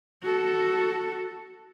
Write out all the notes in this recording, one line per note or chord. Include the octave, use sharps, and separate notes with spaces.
F#4 A4